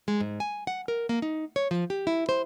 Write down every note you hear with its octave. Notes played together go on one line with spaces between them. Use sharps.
G#3
G#2
G#5
F#5
A#4
A#3
D#4
C#5
F3
G4
E4
C5